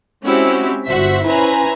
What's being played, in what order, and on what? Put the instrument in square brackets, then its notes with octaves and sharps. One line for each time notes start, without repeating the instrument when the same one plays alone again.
[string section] G#3 C4 C#4 E4 F#4 G4
G1 F#4 C5 E5 B6
C#4 E4 B4 C5 G#5 A#5